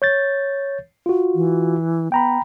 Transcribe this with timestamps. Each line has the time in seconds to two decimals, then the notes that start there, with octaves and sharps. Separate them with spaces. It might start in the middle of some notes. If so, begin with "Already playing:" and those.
0.02 C#5 G6 A6
1.06 F4 F#4
1.35 E3
2.12 B3 G5 A#5 B5